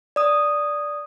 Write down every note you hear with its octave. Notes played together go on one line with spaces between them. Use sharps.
D5 D#6